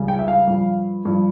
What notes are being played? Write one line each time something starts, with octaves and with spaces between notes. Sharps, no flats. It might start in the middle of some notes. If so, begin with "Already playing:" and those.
Already playing: C#2 C#3 G3
G5
E5
F5
G2 F3
G2 F3